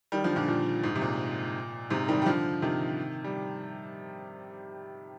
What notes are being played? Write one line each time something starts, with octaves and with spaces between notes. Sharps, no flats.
D#3 G3
D3 F3
A#2 D3
A#2
G#2
C3
A#2
G#2 C3
D#3 G3
G3
D3 F3
C3 D#3
G3